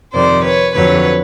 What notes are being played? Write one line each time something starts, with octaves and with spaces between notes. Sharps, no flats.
F2 C3 D#3 C5 D5
B4 C#5
F2 D3 F#3 B4 C#5